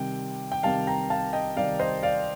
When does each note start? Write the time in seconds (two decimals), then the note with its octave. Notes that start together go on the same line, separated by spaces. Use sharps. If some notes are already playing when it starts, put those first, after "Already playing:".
Already playing: C3 D#3 G3 G5
0.52 G5
0.63 C3 D#3 G3 F5 A5
0.87 G5 A#5
1.10 F5 A5
1.33 D#5 G5
1.56 C3 D#3 G3 D5 F5
1.79 C5 D#5
2.03 D5 F5